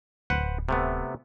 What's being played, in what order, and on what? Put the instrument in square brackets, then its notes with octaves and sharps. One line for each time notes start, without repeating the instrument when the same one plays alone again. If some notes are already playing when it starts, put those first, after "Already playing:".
[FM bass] D1 [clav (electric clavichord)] B4 C5 F#5
[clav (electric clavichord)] C3 A3 B3